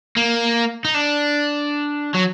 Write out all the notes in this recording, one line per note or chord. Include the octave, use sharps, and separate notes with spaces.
A#3
D#4
D4
F#3